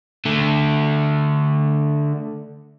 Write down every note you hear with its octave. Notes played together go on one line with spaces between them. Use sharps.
D3 A3